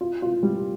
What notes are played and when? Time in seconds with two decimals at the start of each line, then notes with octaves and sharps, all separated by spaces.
0.01 F4
0.22 F4
0.43 G3